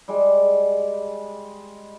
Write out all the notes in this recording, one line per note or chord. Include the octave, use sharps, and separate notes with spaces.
G3 G#3